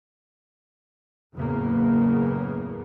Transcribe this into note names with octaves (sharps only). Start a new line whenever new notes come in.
F#1 E2 A2 C#3 A#3 B3